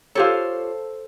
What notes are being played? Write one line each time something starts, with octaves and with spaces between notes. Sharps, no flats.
F4 G4 A4 C5 C#5 F5